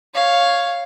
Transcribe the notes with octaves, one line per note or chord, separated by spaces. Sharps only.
C#5 F5